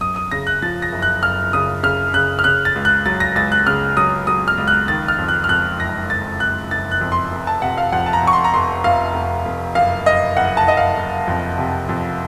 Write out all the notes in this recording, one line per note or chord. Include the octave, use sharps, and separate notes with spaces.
F#2 D#6
D#6
C#3 A#6
F#6
F3 A6
A#6
F#1
F#6
F#1 F6
C#3 D#6
C#3 F6
C#3 F#6
F6
C#3 F#6
A6
C#2
F#6
F#3 A6
A#6
C#2 A6
F#6
C#3 F6
F#3 D#6
F#3 D#6
F6
C#2
F#6
D#3 A6
F6
F2
F#6
F6
F2 F#6
F#1 A#6
F#1 A6
F#1 F#6
F#1 A6
F#6
F2
C6
F1
A5
C3 F#5
F5
F2 F#5
A5
A#5
F2 C#6
C6
A#5
F1 C6
F1 F5
F1
F1
F#1 F5
F#1 D#5
F#1 F#5
A5
F#1 D#5
F5
F#1
F2
C3
F2